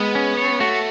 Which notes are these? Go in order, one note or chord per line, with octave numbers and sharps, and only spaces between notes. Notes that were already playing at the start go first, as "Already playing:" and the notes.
Already playing: G#3 B3
C#4
C#5
A3 F#4